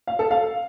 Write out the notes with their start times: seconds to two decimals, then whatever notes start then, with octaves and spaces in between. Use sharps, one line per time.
0.07 F5
0.19 A4
0.31 F5